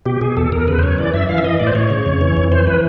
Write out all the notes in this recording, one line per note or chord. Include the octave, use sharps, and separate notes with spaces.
B2 G4
B2 G#4
E2 A4
E2 A#4
C#3 B4
C5
F#2 C#5
E3 D5
F#2 E5
E3 F5
E5
E3 D#5
A2 D5
C5
A2 C#5
C#3
F2
E3
F2
E3 C5
E3 B4